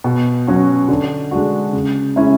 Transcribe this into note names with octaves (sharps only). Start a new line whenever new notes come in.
B2
F#3 C#4 F#4
D3
G#3 D4 F#4
C#3
G#3 C#4 E4